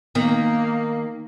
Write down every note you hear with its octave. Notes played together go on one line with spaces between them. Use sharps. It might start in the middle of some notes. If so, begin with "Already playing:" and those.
D#3 A#3 B3